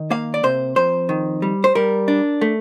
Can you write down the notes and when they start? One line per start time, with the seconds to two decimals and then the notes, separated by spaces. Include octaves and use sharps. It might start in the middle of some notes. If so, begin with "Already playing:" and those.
Already playing: D#3
0.11 A#3 F5
0.34 D5
0.43 C3 C5
0.76 F2 C5
1.09 D#3
1.42 G3
1.64 C5
1.75 G3 A#4
2.08 D4
2.41 A3